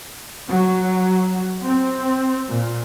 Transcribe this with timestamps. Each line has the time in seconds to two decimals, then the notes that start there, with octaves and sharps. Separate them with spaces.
0.47 F#3
1.63 C4
2.47 A#2